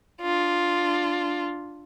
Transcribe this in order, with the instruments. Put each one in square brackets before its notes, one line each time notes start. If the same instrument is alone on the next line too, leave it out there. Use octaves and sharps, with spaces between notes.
[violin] D4 F4